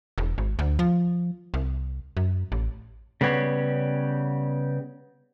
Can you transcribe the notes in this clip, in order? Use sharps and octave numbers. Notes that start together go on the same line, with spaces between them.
E1
G#1
D2
F3
C2
F#2
A1
C#3 G3 B3 G4 C#5